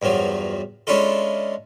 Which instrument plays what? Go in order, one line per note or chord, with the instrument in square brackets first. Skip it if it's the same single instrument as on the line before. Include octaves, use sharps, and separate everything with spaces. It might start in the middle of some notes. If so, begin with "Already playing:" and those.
[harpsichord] E2 G2 F3 F#3
G#3 C#4 D4 E4 F4 A4